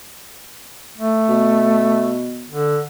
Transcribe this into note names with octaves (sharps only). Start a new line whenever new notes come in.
A3
B2
D3